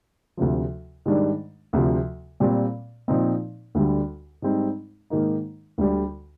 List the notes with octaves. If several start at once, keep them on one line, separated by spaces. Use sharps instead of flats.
D2 C3 F3
G#2 D#3 G3 D4
D2 C3 F3
A#2 G3 C4
A#2 F3 C4 D#4
D2 D3 G3
G#2 G3 C4 D#4
G#2 D#3 A#3 D#4
D2 D3 G3